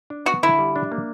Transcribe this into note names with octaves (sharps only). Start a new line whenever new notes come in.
D4
B3 F#4
D3 E4
G3
D4
A#3